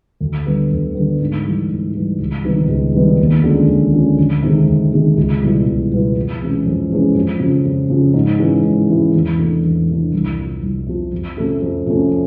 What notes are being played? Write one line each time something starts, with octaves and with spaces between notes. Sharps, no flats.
D2
D3 G3 B3
D2
D3 G3 B3
G#2
E3 G3
G#2
E3 G3
C#2
C3 D#3 G3 B3
C#2
C3 D#3 G3 B3
D#2
D3 F3 G#3 C#4
D#2
D3 F3 G#3 C#4
D2
C3 D#3 G#3
D2
C3 D#3 G#3
C#2
B2 G3 B3 E4
C#2
B2 G3 B3 E4
F2
C3 E3 G#3 C#4
F2
C3 E3 G#3 C#4
F2
C#3 F3
F2
C#3 F3
G#2
E3 G#3 C#4 E4
G#2
E3 G#3 C#4 E4
E2
C3 E3 A3 D4
E2
C3 E3 A3 D4
C2
C3 F3
C2
C3 F3
F2
C3 F3 A3 C#4
F2
C3 F3 A3 C#4